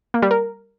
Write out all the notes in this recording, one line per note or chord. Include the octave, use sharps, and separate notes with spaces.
A#3
G3
A#4